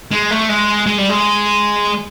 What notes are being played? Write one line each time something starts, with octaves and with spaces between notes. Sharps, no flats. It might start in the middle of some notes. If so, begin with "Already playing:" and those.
G#3
A3
G#3
G#3
G3
G#3